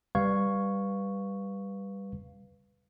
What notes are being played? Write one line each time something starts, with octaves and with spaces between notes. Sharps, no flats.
G3 B4 F5 C#6 G#6